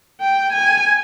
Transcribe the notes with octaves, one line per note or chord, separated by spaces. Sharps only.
G5
G#5